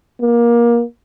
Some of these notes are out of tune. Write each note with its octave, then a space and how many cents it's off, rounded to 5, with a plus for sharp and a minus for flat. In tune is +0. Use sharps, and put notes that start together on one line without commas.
A#3 +20